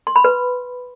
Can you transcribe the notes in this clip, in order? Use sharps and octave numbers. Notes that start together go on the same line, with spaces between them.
C6
B5
B4